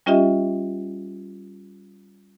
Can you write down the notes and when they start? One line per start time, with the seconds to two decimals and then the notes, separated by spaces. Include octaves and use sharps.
0.06 G3 C#4 F4 G4 D#5 E5